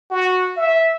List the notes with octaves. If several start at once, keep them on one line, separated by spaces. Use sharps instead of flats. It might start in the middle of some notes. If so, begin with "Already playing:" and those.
F#4
E5